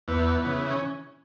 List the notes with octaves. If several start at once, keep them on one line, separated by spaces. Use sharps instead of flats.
E2 B3
C#3 E3
C#4